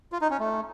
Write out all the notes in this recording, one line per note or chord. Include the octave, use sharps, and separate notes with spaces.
F4
D#4
C#4
A3